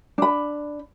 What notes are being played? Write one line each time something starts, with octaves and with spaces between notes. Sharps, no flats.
D4 B5